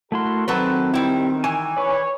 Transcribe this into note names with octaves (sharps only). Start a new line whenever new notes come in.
A3 E4 F#4 A4 A#4 C6
D#3 F#3 C4 A4 B4
G3 E4
E3 G#5
B4 C#5 D5